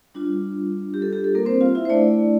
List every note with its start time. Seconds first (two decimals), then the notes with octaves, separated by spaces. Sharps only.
0.14 G3 D4 F4
0.94 G4
1.02 A4
1.13 G4
1.24 A4
1.35 A#3 A#4
1.45 C4 C5
1.61 F4 F5
1.75 E4 E5
1.85 C5
1.90 A3 D4 E4 D5